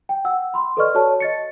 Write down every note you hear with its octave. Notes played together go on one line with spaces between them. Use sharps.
G5
F#5 E6
B5 C6
A4 B4 D5 D#5 C#6 F6
F#4 A4 C#5 A5
D#5 A6 C#7